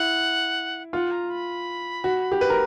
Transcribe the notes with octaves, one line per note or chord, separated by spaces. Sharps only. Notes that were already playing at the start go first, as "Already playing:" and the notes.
Already playing: E4 F#5
F4 F#5
A#5
B5
F#4
G4
B4
A#4